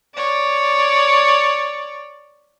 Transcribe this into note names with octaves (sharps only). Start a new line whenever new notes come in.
C#5 D5